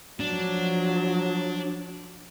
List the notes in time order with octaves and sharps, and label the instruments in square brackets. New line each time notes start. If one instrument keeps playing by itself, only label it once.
[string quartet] F3 F#3 [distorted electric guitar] D4